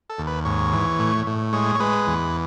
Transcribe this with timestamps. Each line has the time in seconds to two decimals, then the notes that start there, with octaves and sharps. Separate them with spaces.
0.10 A4
0.18 D#2
0.27 B4
0.45 G#2 C#5
0.73 E3
0.99 A2
1.27 A2
1.53 G#3 C#5
1.75 C#5
1.80 G#3 B4
2.07 E2